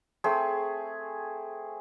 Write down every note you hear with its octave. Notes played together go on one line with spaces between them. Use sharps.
A3 C4 G#4